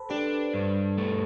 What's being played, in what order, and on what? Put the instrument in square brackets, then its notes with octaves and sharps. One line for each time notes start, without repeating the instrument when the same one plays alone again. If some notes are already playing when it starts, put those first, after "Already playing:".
Already playing: [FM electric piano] A4 B4 C5
[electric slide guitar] D4 [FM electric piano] G4
[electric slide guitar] G2
A3